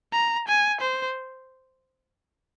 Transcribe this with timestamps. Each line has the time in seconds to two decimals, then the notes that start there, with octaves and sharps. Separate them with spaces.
0.13 A#5
0.47 G#5
0.81 C5